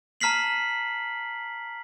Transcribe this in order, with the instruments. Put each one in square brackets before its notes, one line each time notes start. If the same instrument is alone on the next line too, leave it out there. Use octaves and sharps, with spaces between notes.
[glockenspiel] A5 A#5 F6 B6 C7 F#7